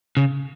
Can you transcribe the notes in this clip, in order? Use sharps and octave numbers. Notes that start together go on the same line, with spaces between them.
C#3